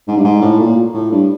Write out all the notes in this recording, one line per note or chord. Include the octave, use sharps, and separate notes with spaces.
G#2
G2
G#2
A2
A#2
A2
G2